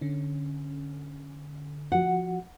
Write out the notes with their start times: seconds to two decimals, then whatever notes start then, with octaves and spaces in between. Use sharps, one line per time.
0.01 D3 C#4
1.92 F3 F#4 F#5